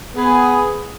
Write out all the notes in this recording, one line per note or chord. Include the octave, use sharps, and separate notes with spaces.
B3 G#4